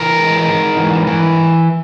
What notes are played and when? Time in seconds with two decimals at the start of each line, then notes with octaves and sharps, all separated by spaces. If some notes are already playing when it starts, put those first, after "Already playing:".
Already playing: E3 A#4
0.18 G#3
0.47 G#2
0.77 E3
1.07 E3